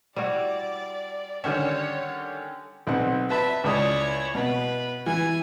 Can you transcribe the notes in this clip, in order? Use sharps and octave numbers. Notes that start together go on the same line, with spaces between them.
G3 E4 F#4 D5
D3 D#3 G3 C#4 C#5 E5
B1 C4 F#5
B4 E5 A5 B5
C#2 E4 C#5 D5 D#6
B2 B4
E3 G#5